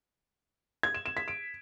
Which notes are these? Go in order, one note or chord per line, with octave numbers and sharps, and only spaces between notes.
G#6
E7
E7
B6
D7